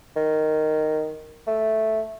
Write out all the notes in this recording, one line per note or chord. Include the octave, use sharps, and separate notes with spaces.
D#3
A3